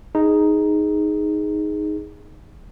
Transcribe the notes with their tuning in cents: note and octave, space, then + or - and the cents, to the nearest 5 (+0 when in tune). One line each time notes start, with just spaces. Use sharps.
D#4 +0 G#4 +0